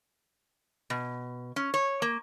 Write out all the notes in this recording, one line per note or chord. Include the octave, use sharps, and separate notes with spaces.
B2
C#4
C#5
A#3